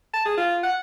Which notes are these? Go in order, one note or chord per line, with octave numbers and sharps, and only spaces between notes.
A5
G#4
F4
F#5